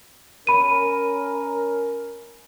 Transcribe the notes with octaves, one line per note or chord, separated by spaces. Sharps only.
C#4 A#4 B5 D#7